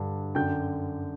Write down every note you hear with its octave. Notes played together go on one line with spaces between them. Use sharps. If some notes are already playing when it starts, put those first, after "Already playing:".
Already playing: G2 D3
F#2 D3 G5 G6